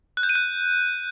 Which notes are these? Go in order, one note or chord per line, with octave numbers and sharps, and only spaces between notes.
F#6
G6
D#7
F#6